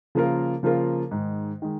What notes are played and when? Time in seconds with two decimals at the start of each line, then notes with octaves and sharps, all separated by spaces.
0.15 C#3 F3 A#3 F4 A#4
0.63 C#3 F3 A#3 F4 A#4
1.11 G#2 D#3 G#3
1.62 D#3 G#3